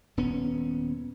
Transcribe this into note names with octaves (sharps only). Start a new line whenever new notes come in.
D#1 B3 C#4